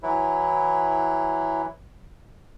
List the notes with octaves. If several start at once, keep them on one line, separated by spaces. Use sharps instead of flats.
E3 F#3 E4